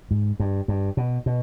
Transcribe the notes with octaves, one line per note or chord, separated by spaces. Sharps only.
G#2
G2
G2
B2
B2